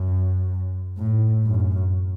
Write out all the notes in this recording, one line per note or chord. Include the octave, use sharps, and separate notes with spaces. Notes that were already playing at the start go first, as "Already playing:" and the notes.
Already playing: F#2
A2
F#2